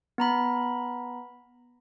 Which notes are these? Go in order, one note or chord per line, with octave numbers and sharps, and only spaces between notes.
B3 A#5 B5